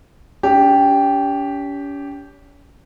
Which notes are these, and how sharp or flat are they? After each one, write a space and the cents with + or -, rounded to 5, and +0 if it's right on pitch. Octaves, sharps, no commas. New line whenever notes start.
C#4 +40 G4 +0